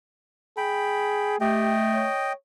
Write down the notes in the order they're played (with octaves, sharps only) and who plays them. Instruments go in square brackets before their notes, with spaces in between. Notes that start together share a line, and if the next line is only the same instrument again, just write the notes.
[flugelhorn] G#4 [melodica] G5 B5
[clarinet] A3 [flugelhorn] G4 [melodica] D#5 G5
[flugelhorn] C#5